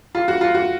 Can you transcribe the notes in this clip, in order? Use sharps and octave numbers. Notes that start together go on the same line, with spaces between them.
F4
F#4
F4
F#4